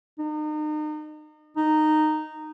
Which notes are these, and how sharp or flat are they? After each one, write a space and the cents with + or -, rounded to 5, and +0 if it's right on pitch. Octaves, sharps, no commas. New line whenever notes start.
D#4 -35
D#4 -10